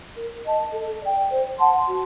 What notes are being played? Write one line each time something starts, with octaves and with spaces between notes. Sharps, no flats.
A#4
D#5 A5
A4
D5 G5
C5
F#5 A5 C6
F#4